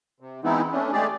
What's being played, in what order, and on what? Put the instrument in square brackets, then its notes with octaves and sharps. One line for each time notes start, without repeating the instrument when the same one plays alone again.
[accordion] C3
E3 G#3 B3 C4 D#4 E4
A3 C#4 D4
G#3 A3 G4 G#4 D5